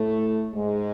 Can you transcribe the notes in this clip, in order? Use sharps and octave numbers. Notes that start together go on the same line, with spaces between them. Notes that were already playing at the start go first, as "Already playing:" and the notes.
Already playing: A2 A3
G#2 G#3